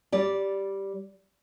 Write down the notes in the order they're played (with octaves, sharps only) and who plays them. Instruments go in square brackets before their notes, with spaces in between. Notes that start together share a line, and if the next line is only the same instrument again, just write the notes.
[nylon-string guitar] G3 D5